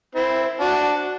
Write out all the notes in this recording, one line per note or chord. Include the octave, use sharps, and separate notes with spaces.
C4 E4
D4 F#4